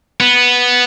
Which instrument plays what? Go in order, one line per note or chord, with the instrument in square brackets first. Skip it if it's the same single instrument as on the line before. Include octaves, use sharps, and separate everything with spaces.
[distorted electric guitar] B3